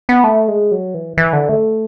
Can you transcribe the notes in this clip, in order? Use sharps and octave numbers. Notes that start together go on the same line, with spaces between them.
B3
A3
G#3
F#3
E3
E3
D3
A3